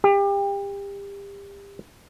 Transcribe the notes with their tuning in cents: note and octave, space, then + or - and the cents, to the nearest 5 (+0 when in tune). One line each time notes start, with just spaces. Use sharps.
G4 +30